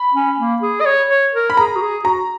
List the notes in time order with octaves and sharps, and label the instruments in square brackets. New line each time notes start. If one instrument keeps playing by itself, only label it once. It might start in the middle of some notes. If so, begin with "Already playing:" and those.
Already playing: [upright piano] B5
[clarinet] C#4
A#3
G#4
D#5
C#5
C#5
A#4
[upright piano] B5
[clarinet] G#4 [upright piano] A#5
[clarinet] F#4
G#4
[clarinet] F#4 [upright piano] A#5